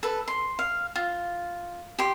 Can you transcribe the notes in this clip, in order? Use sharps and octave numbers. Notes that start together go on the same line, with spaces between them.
A4 B4
C6
F5
F4
G4 C6